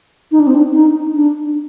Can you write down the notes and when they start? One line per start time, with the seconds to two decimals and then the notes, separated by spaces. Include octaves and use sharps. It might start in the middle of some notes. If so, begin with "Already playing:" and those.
0.32 D#4
0.40 D4
0.47 C4
0.55 D4
0.73 D#4
1.15 D4